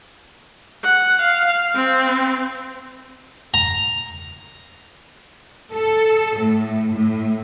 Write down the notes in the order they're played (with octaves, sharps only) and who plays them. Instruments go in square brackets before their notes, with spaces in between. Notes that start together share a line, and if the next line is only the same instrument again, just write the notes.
[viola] F#5
F5
C4
[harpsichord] A#5
[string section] A4
A2
A2